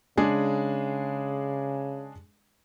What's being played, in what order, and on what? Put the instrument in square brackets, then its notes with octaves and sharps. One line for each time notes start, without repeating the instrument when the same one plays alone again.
[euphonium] C#3 [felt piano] G#3 D4 G#4